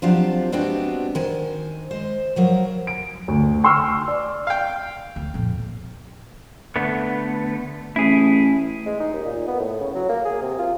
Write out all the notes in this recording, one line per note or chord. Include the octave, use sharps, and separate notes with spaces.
F3 F#3 C4 D4 F4 G4
G#3 B3 C4 D4 F#4 G4
D#3 C5 G#5
G#3 C5
F3 F#3 A#4
D7
D2
G5 C6 C#6 E6 F6
D5
F5 G5
D2
F2 A#2
D3 A3 B3
A1 E4 G#4
G#3
D#4
D#2
A#2
B3
A2
C#3
F#3
A#3
G#4
C3
F4